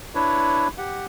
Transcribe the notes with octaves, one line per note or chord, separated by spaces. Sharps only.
D4 E4 B4 C#5
G4 F#5